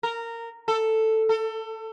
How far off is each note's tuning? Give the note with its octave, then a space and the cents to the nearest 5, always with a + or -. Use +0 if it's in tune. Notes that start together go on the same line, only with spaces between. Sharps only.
A#4 -15
A4 +5
A4 +30